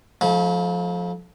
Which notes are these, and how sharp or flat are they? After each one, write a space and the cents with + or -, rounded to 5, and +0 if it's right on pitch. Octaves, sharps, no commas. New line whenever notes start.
F3 +20 A3 -30 E4 -40